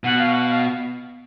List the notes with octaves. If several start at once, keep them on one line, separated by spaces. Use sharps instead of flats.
B2 F#5
F5
F#5
F5